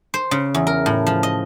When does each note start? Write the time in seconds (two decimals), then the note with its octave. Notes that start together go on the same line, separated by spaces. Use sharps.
0.14 C5
0.31 C#3
0.54 E2
0.67 A#4
0.86 A2
1.07 F3
1.23 D#5